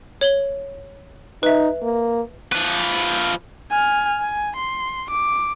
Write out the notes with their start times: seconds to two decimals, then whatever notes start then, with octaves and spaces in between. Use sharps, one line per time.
0.21 C#5 F#7 G7
1.43 D#4 B4 E5
1.83 A#3
2.52 F3 B4
3.71 G#5 F6
4.21 G#5
4.56 C6
5.11 D6